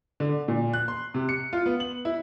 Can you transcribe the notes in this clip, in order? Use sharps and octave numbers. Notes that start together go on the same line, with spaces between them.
D3
A#2
F#6
C6
C3
C#7
F4
B3
F#7
E4